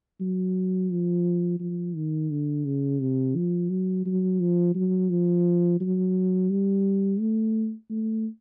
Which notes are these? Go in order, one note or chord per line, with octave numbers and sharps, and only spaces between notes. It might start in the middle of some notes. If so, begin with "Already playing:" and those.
F#3
F3
F3
D#3
D3
C#3
C3
F3
F#3
F#3
F3
F#3
F3
F#3
G3
A3
A3